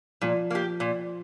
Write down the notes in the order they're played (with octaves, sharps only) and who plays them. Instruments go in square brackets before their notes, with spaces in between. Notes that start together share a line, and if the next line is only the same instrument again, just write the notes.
[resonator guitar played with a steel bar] A#2 [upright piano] F3
[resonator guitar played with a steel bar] A#3 G4
A#2